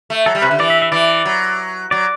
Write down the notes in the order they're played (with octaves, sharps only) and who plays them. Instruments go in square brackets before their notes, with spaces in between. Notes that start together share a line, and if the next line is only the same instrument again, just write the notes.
[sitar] A3
[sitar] F#3 [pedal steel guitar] A4
[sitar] G3
[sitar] C3 [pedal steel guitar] B4
[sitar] D3
[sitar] E3 [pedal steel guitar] D5
[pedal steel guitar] E5
E5
[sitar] E3 [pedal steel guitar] D5
[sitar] F#3
[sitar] F#3 [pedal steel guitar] D5